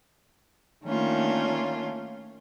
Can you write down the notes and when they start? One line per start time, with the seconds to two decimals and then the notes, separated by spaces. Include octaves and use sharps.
0.86 D#3 A3 A#3 C#4 D4 F4